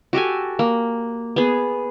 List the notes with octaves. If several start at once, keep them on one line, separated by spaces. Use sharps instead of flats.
F#4 G4 A4 G#5
A#3
B3 G#4